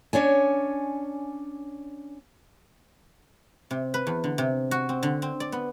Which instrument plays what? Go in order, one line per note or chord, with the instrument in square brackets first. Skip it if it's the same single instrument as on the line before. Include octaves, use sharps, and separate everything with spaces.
[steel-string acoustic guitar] C#4 D4 C#5 G#5
[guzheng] C3
B4
E2
D3
C3
F#4
C4
D3
C4
D5
B3